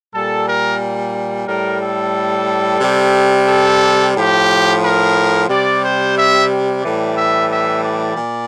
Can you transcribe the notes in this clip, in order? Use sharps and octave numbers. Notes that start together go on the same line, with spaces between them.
A#2 G3 A4
A#4
A2 G3 A#4
A4
C3 G3
A4
A2 F3 G4
A#4
C3 G3 D5
C5
E5
A2 E3 G3 D5
E5
E5
D5
A#2